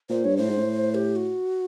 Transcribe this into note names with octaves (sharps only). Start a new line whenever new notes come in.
A#2 C5
G2 C#5
A2 C5
G#2
A2
G4
F#4